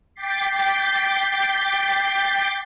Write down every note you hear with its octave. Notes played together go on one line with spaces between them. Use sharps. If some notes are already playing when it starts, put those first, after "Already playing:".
G5 D6 G6 A6 B6 C7